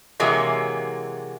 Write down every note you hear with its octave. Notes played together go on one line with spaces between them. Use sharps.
C3 E3 F#3 G#3 A#3